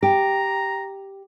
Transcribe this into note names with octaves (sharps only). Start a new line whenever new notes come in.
G4 A#5